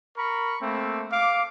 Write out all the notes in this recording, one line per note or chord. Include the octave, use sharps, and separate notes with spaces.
A#4 B5 C#6
A3 A#3 C4
F5 D6